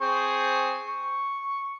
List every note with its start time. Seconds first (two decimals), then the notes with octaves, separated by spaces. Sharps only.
0.01 C4 G#4 C#6
0.88 C#6